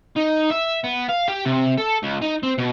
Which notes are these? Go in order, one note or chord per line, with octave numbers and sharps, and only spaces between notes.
D#4
E5
B3
F5
G4
C3
A4
C#2
D#4
C4
B2